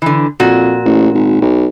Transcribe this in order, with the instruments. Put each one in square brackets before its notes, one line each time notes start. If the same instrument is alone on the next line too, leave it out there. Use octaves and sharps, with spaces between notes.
[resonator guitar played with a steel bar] D3 E3
[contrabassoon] F2 [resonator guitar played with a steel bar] A#2 F#4
[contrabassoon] A1
G#1
B1